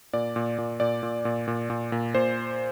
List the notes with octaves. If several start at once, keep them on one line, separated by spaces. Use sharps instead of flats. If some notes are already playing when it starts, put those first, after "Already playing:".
A#2 D5
A#2
A#2
A#2 D5
A#2
A#2
A#2
A#2
A#2
A#2 C5